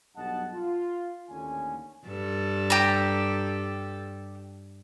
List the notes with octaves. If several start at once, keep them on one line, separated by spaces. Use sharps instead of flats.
B1 G2 D#5 F#5 A5
F4
D#2 A2 D3 C#4 G#5
G2 A4
G4 A#5